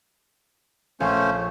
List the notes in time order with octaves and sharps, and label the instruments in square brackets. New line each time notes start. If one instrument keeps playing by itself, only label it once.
[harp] A#1 F5 G#5 [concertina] A3 C#4 C5